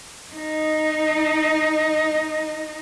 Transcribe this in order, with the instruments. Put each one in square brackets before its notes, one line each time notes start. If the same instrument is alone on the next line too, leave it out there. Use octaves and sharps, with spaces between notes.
[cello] D#4 D#5